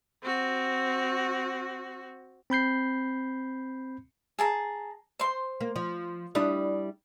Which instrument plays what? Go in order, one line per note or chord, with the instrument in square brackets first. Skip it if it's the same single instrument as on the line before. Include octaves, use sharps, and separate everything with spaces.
[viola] C4 F#4
[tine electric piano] C4 B5 G6 C7
[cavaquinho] G#4 A5 A#5
C5 C6
[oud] A#3
F3
[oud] G3 D4 E4 [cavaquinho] D#6